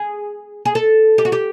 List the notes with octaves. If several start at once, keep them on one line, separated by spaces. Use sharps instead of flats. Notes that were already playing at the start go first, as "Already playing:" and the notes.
Already playing: G#4
G#4
A4
G4
F#4
G4